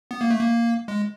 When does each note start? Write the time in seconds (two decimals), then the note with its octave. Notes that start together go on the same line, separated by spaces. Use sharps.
0.11 B3
0.21 A#3
0.30 A3
0.40 A#3
0.88 G#3